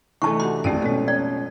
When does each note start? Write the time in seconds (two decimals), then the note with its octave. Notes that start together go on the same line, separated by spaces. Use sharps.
0.22 C3 E3 A3 D4 D#4 A5 C#6
0.40 F#4 G4 F#5 C6
0.64 A1 F2 D#3 G#3 A3 C4 D4 D5
0.82 B2 F3 G#3 C#4 A4
1.08 D5